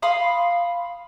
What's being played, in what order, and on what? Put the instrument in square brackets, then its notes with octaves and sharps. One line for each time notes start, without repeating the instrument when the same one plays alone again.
[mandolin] F5 B5 C6 D#6